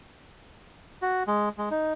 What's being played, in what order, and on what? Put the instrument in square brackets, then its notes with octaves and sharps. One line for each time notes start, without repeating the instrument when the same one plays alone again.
[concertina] F#4
G#3
G#3
D#4